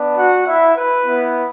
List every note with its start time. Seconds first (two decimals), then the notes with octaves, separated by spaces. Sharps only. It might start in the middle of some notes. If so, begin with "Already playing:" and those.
Already playing: B3 D4
0.18 F#4 F#5
0.47 E4 E5
0.76 B4
1.05 B3 E4